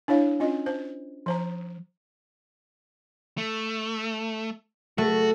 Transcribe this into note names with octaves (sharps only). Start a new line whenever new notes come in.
D4 E4 C#5 F5
C#4 F4 D#5
C5
F3 C5 A#5
A3
A3 F#4